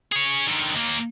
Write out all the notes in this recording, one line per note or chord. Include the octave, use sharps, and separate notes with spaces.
G#4 C#5
D3 D#3
D#2 A#3